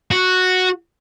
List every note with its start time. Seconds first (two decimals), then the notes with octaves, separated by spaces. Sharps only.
0.11 F#4